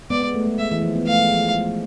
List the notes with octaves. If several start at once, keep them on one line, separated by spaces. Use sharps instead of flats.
G#3 B3 D5
G#3 B3
A3
G#3
G#3 E5
E3
F3
B3
A3 F5
G#3
F3
G#3